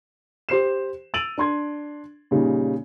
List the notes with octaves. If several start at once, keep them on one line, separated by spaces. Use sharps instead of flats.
G4 C5 C7 E7
E6 A6 D7 D#7 F7 F#7
D4 C6 G#6
A#2 C#3 G3 D#4